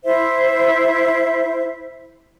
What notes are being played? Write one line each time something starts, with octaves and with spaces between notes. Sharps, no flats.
E4 C5 E5